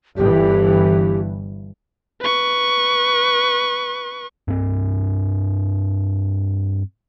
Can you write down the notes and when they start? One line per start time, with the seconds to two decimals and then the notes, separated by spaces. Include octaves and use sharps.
0.17 G1 G2 E3 G4
2.21 B4 C#6
4.48 G2 C4